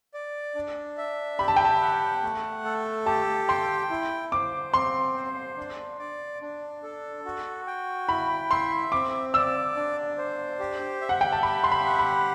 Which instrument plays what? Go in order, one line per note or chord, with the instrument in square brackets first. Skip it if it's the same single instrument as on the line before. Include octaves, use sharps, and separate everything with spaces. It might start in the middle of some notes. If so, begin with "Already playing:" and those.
[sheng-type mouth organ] D5
D4
E5
[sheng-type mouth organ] G4 [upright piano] B5
[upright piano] A5
G5
A5
[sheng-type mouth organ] F#5
A3
A4
[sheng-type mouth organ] G4 [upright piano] A5
[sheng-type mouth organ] G5 [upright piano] C6
[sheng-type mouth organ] E4
[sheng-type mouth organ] C5 [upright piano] D6
[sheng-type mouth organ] C4 [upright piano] C6
[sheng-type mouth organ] C5
D4
D5
D4
A4
F#4
G5
[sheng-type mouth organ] E4 [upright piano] B5
[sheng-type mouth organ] E5 [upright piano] C6
[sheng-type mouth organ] C4 [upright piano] D6
[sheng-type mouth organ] D5 [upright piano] E6
[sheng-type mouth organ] D4
C5
G4
E5
[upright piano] F#5
G5
A5
[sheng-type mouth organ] G4 [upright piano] B5
[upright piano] C6
B5
[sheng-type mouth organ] F#5
[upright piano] B5